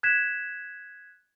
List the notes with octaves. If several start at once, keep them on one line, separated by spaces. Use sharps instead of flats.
F#6 G#6 B6 E7